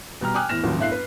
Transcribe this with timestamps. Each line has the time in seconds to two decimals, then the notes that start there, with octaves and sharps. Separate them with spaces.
0.21 B2 G3 A#5 F6
0.35 G5 G#5 D6 D#6 F6 F#6
0.49 E2 A2 F6 A#6 E7
0.64 A1 D#2 F3 F#3
0.79 G1 A2 E5 F5 F#6 C7
0.92 B4